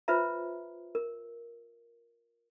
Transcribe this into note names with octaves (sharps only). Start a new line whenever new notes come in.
F4 B4 C5 E5 A#5
A#4